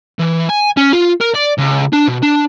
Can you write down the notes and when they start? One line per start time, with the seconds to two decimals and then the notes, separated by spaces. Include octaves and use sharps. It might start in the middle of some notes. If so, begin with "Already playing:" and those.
0.19 E3
0.49 G#5
0.77 C#4
0.93 F4
1.21 A#4
1.35 D5
1.58 C#2
1.93 D4
2.08 B2
2.23 D4